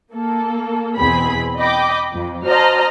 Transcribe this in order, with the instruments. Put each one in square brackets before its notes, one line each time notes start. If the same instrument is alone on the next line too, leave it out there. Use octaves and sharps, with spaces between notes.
[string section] A#3 A4
E2 B2 C4 G#4 B5
D#5 G5 B5 D6
F2
F#4 C5 D#5 A5 A#5 F6